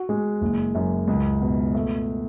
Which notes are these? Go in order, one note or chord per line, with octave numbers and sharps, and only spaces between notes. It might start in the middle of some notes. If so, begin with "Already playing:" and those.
Already playing: F#4
G#3
F#1
F#2
C#2
B2
A3